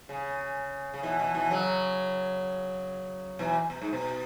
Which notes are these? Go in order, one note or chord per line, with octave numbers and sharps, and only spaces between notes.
C#3
C#3
B2 E3
B2 E3
B2 E3
C#3 F#3
B2 E3
B2
G#2
B2